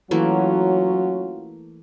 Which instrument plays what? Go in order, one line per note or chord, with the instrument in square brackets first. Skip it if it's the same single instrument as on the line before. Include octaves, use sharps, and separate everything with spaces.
[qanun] E3 A3 A#3 [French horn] F#3 [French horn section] C#4 F4 F#4